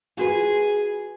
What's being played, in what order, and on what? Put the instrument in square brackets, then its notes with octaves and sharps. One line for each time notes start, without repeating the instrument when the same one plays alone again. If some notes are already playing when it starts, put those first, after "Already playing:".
[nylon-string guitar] F4 F#4 B4 [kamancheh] G#4